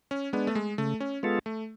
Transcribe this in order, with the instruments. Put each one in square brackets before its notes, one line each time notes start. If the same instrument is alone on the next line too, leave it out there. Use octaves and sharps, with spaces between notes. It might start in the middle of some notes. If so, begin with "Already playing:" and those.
[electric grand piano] C#4
[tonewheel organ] G#3 D4 [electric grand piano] B3
[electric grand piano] A3
G#3
[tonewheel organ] C#3 [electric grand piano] A3
[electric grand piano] C#4
[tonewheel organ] G#3 B3 F4 A4
[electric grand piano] A3